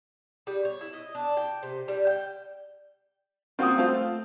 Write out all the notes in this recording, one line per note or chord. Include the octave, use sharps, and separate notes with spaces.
G3
C#5
E4
D#5
D4
G5
C3
G3
G5
A#3 C4 F4 F#4 D#6
A3 F4 C5